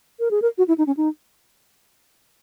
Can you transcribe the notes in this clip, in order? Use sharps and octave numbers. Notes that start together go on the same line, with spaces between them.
A#4
G#4
A#4
F#4
E4
D#4
C#4
D#4